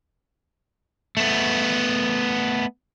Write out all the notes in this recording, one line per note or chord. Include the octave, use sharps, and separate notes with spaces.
A3 B3